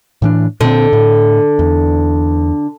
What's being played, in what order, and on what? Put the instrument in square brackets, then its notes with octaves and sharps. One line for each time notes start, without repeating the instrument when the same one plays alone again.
[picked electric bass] A2 E3 D4
[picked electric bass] A#2 C4 [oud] D3
[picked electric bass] A2
E2